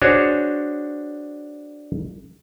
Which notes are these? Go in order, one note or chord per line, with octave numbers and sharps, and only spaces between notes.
D4 F#4 G#4 C5 C#5